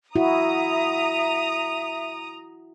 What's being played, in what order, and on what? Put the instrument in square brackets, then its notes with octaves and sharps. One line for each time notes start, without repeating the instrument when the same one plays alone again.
[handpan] E4 F#4 [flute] E5 [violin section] A#5 D#6